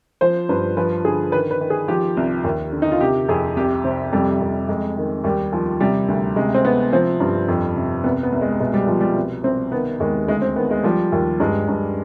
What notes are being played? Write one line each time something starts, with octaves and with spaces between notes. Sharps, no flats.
F3 C5
G2 B4
F3 B4
D3 G#4
D#3 B4
B4
D#3
G#4
F3 G4
C2
D#2
D3
D#4
F4
C3 G4
F2 G#4
C2 G4
C3 C4
F2 G3
F2
F2 G#3
D#3
D#2 G3
D#3 F3
C3 G3
D2
C3 G#3
C4
C3 B3
F3 C4
G2
F2
C3
C2 B3
B3
C2
G#3
B2 G#3
G3
B2 F3
G3
C2
C2 C4
D#3 B3
D#2 G#3
D2 G#3
C4
D#3 B3
G#3
F3 G3
D#2
G2 G#3
G2